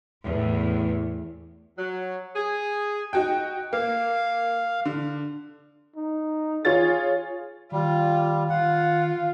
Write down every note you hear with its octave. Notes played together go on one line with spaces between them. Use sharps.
E2 A2
F#3
G#4
D#4 F#4 G5
A#3 F5
D3
D#4
F4 G#4 C#5 A6
D#3 G3 F4
D#3 F4 F5 F#5